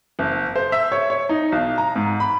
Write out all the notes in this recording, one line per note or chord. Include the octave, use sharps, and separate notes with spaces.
F#1
C5
E5
C#5
C#5
D#4
B1
A#5
G#2
B5